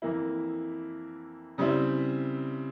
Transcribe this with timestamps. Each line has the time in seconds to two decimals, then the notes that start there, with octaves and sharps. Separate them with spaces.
0.02 F2 E3 A#3 E4
1.58 C#3 G3 C4 E4